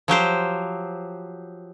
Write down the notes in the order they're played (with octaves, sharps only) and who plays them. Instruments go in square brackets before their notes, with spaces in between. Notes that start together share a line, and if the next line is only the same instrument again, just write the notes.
[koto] F3 F#3 G4 C5